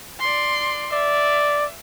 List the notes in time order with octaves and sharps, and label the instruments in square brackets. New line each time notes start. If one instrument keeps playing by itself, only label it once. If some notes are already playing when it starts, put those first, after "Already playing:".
[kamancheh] D5 C6
[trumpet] D5 [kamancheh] E5